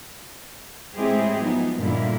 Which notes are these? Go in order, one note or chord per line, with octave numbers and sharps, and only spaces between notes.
A2 G#3 C4 E4 G4 G#4
F3 F#3 B3 D#4
G2 A#2 D3 A#3 E4